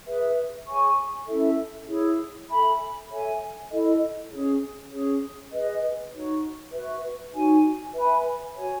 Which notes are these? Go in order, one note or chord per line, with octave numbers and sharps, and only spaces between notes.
G#4 B4 E5
G#4 C#5 G#5 C#6
C#4 E4 A4 E5
E4 G#4 C#5
A4 E5 G#5 B5
A4 C#5 E5 G#5
E4 A4 D#5
C#4 G#4 C#5
C#4 G#4 C#5
G#4 B4 D#5
D#4 F#4 C#5
F#4 B4 E5
D#4 F#4 C#5 G#5
B4 E5 G#5 B5
F#4 C#5 G#5